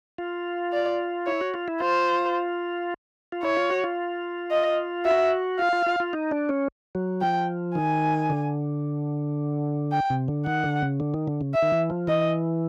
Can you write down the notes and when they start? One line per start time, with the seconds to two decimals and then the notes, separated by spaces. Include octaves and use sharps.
0.18 F4
0.73 D5
1.27 E4 C#5
1.41 F#4
1.54 F4
1.68 E4
1.81 F4 C5
3.32 F4
3.43 E4 C#5
3.57 F4
3.70 F#4
3.84 F4
4.51 D#5
5.05 F#4 E5
5.59 F4 F5
5.73 F4
5.86 F4
6.00 F4
6.13 D#4
6.31 D4
6.49 C#4
6.95 F#3
7.21 F3 G5
7.75 D#3 G#5
8.30 D3
9.92 G5
10.10 C3
10.28 D3
10.46 D#3 F#5
10.64 D3
10.82 C#3
11.00 D3
11.14 D#3
11.28 D3
11.41 C#3
11.54 E5
11.62 D#3
11.72 E3
11.90 F3
12.07 E3 D#5